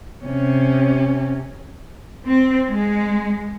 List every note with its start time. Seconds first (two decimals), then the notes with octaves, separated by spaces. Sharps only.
0.25 C3 C#4
2.27 C4
2.72 G#3